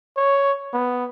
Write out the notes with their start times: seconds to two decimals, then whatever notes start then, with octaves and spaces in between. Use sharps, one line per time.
0.17 C#5
0.73 B3